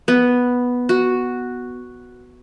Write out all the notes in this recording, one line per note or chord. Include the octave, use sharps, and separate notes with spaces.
B3
F#4